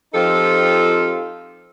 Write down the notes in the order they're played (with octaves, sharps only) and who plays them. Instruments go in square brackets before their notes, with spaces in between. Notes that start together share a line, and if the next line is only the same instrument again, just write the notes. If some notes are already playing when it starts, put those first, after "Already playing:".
[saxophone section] F3 C4 D#4 F4 G4 A4